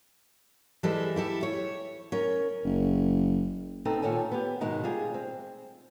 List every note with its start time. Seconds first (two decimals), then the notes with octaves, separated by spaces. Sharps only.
0.83 E3 G3 G#3 A4 E5
1.16 E4 G4 A4
1.43 C#5
2.12 C#4 A#4
2.64 F#1
3.85 B3 C4 D#4 A4
4.02 A#2 D#3 A4 C#5 G#5
4.32 B3 G4
4.61 G#2 B2 D#3 G#3 D#4
4.83 G3 F4 G#4
5.14 C4